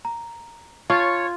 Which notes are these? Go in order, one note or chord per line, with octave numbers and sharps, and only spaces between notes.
A#5
F4 C#5 A5 C#6 A6